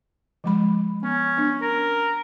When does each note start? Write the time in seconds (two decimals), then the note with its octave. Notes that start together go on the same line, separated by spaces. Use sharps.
0.44 F3 G#3 B5
1.03 B3 C#4
1.37 B3 D4
1.62 A#4